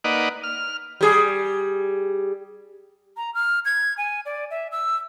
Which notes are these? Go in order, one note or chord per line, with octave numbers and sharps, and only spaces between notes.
A#3 D#4 B4 D5 D#5 F#5
F6
G3 G#4
A#5
F6
G#6
G#5
D5
E5
E6